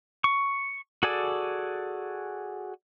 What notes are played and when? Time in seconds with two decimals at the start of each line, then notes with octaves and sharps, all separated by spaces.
0.24 C#6
1.03 F#4 G#4 A4 D5 G#5